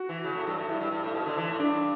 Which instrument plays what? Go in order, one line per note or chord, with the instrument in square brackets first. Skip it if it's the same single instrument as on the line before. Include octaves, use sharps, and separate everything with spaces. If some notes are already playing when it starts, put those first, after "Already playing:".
Already playing: [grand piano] F#4
[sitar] E3
C#3
A2
G2
A2
[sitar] G2 [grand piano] E4
[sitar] G2
G2
A2
B2
D3
E3
A2
[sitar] G2 [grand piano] D4